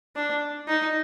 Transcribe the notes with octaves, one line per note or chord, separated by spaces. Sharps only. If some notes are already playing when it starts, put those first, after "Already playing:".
D4
D#4